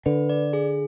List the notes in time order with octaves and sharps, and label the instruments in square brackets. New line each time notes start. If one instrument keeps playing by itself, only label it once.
[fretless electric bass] D3 [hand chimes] B4
[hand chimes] D5
G#4